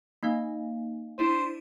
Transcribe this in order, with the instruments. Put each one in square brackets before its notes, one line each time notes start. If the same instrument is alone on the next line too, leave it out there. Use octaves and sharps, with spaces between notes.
[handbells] A#3 D#4 F5
[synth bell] D4 E4 D#7 [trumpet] C5